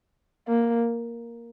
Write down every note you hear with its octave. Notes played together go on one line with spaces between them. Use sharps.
A#3